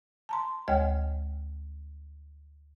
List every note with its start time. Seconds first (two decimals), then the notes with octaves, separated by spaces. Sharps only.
0.29 A5 A#5 C6
0.68 D2 G#3 C#5 G5 G#5 F6